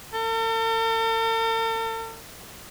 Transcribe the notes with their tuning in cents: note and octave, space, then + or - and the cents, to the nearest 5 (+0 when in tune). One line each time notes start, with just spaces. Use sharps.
A4 +45